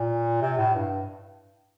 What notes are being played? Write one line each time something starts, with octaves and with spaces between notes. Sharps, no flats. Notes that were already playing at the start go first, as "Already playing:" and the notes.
Already playing: A#2
C3
A2
G2